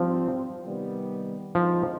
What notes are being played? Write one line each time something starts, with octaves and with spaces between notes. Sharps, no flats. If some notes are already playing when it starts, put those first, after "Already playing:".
Already playing: G#2 F3 G3 C4
C3 D#3 G3 B3
D3 F3 G#3 C4 D#4